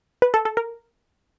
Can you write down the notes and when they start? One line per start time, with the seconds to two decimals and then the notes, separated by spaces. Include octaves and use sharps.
0.22 B4
0.34 A4
0.45 A4
0.57 A#4